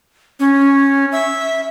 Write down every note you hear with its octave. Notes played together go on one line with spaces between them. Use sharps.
C#4
E5